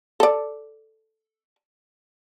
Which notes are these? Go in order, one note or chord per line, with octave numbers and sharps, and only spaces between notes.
A4 D5